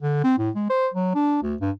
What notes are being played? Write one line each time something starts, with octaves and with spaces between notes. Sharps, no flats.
D3
C4
A2
G#3
C5
F#3
D4
D2
G2